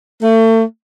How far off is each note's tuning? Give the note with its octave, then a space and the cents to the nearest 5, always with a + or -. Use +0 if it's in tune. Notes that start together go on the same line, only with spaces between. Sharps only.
A3 +35